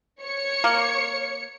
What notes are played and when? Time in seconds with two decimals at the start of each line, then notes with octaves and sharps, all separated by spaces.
0.23 C#5 C#7
0.64 A#3